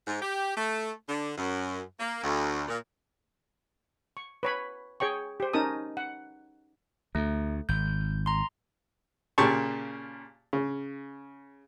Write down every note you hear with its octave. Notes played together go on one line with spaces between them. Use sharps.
G#2
G4
A3
D3
F#2
A#3
D2
A#2
C#6
B4 C#5 B5
G#4 C#5 G5 C#6
G4 C5
C#4 D#4 A#4 A5 D#6
F#5
D2 A3
G#1 G6
A#5 C6
A#2 C#3 G4 A5 C#6
C#3